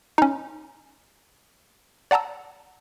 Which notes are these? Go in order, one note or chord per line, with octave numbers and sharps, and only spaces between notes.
C#4 D#4
D5 F#5 A5 A#5 E6